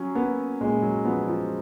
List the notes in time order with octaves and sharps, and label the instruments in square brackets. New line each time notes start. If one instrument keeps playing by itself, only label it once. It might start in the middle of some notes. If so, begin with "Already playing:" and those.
Already playing: [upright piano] F#3 [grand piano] C#4
[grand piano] A#3 [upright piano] B3
[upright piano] A#2 [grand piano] G#3
[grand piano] F#3
[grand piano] F3 [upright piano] B3
[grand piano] F3